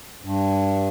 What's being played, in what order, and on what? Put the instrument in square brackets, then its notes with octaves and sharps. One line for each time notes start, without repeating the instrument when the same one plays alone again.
[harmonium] G2